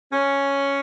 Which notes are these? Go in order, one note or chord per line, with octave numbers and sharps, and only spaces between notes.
C#4